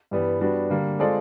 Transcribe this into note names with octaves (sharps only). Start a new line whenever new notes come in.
G2 E3 G3 B3
G3 B3 D4 F#4
D3 G3 A#3
G#3 C4 F4 A4 D5